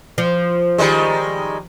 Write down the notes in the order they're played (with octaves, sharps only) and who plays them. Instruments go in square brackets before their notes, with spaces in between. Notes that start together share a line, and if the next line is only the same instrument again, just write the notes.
[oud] F3
[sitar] D#3 G3 G#3